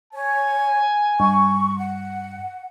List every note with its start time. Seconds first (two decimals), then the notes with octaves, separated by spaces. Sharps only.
0.13 C#5 G#5
1.20 G2 C#6
1.76 F#5